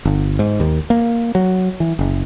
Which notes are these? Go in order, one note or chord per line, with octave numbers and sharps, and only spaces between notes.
G1
G#2
D#2
A#3
F#3
E3
F#1